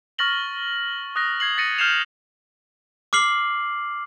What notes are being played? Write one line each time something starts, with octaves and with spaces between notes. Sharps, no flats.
C#6 F6 A6 A#6 F#7 G7
D#6 F#6 A#6
G#6 C7 F#7
A6 A#6 C#7 D#7
F6 G6 C7 E7 F7
D6 F6 C7 F#7